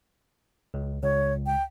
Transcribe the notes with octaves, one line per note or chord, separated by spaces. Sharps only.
C#2
C#2 C#5
G5